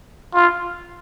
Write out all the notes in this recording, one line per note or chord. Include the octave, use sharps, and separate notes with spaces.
F4